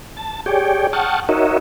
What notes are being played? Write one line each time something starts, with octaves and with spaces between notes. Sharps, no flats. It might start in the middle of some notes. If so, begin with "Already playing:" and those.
A5
G4 G#4 C#5 D5 G5
F#5 G5 A5 C#6 D#6 F6
D#4 F#4 A#4 C#5 D#5 E5